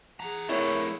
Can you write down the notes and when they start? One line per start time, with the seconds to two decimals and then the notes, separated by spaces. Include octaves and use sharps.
0.20 E3 G#4 F#5 A#5
0.49 A3 C4 E4 A4 A#4 C#5